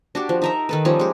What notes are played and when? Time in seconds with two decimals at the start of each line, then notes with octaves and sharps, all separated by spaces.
0.15 D4 F#4 G4
0.29 F3
0.42 D#4 A#4 E5
0.69 D#3 A4 B4
0.85 F3 G3 C#4 D#4
0.99 G#3 G4